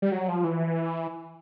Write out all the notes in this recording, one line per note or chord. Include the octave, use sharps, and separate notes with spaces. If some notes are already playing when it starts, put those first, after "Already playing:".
G3
F#3
F3
E3